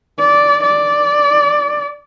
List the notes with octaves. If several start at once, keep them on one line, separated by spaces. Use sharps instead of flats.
D5
D5